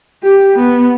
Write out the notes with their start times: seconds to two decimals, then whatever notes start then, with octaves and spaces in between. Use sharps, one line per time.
0.23 G4
0.56 B3